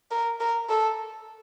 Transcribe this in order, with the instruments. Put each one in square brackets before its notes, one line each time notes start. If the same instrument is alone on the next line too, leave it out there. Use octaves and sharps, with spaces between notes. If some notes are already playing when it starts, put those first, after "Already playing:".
[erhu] A#4
A#4
A4